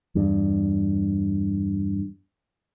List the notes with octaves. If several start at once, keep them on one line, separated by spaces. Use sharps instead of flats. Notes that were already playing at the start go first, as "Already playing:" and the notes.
E2 G2